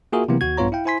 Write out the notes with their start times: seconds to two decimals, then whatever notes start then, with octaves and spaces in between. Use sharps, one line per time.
0.12 A#3 F4 F#4 G#4 A#4 E5
0.29 C3 E3 F#3 A#3 B3 E4
0.41 D#2 F#4 G#6
0.57 A#1 G2 B3 F4 C#5 A#5
0.72 E4 F5 G5
0.85 E4 C5 G#5 C6 B6